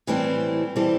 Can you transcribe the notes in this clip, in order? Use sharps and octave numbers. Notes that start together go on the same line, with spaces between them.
A2 E3 G3 C4
E3 G3 C4 A4